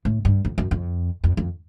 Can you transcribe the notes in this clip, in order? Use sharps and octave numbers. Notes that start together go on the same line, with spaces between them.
A2
G2
F2
F#2
F2
F2
F2